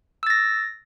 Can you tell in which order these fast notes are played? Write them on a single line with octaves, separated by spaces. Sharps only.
E6 A6 A#6